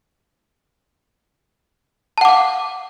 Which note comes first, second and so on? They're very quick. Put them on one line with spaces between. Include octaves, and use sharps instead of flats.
A5 F#5 D6 F5